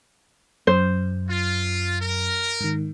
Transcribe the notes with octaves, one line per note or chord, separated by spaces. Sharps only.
F#2 C5
F4
A#4
G#2 D#3